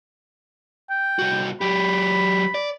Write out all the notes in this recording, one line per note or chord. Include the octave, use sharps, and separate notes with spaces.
G5
C2 F#4
F#3 G4 B5
D5